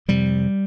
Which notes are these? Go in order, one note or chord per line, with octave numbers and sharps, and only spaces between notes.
F2 C3 G3